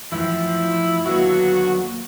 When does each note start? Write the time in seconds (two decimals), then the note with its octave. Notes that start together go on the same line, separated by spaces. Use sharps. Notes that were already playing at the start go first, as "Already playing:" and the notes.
0.12 F#2 A2 E3 F3 E4
1.06 D#2 D3 F#3 A#3 B3 F#4 E5